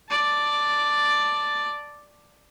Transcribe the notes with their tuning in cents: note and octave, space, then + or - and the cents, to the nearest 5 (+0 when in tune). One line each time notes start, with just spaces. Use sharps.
D5 +0 A5 +0